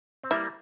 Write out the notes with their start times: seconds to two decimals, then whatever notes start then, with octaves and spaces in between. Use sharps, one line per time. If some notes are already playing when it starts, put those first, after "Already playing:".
0.23 C4
0.31 G3 A#3 E4